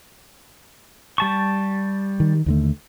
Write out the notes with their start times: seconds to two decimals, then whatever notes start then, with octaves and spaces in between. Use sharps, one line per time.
1.18 G3 A5 C#6
2.20 D#3
2.46 D#2 D3 A3